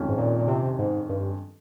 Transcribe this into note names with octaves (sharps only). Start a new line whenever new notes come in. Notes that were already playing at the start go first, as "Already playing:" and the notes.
Already playing: F2 D#3 G#3 C#4 F4
G#2
A#2
A#2
C3
G#2
G2